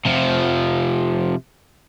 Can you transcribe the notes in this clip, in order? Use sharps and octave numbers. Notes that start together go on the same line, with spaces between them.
C3 F3